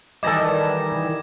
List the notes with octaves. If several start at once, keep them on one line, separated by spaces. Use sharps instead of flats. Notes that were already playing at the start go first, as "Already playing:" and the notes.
D#3 E3 G3 A4 D#5 D6 G#6 A#6